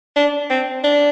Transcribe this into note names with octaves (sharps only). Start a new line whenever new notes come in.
D4
C4
D4